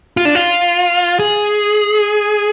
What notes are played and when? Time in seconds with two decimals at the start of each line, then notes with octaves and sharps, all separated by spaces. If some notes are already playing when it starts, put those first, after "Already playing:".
0.17 F4
0.25 D4
0.35 F4
1.19 G#4